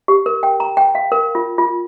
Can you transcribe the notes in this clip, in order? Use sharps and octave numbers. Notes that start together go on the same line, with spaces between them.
G4
A#4
G5
A#5
G5
F5
A#4
F4
F4